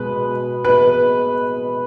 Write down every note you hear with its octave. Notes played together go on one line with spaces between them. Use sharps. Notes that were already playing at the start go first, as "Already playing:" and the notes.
Already playing: B2 G#3 B4
B4